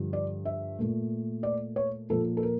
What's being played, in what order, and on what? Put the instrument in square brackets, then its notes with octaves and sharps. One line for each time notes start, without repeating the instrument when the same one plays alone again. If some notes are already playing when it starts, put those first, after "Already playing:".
Already playing: [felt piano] G2 D3 F3
D5
E5
A#2 A3
D5
C#5
A#2 F3 A#3 A4
A4
A#4